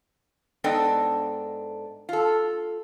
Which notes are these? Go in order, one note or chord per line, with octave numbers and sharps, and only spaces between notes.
G#2 B3 D4 A4 D#5 G5
F4 A4